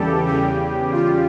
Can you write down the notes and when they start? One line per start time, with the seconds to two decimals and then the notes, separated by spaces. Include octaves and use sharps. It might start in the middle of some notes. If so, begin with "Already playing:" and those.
Already playing: E2 C#3 E3 G3 G4 A4
0.27 E2 C#3 G3 G4
0.92 F4